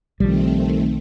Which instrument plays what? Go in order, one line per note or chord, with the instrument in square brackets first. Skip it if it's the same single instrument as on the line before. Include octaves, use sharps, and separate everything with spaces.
[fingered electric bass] B1 F3 [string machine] D#3 A3 C4 [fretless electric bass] G3